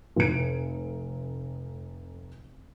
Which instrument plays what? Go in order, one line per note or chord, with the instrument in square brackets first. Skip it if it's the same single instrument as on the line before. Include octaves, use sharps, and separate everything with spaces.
[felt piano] F1 D7